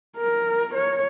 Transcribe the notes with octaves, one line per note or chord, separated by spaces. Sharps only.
A#4
C#5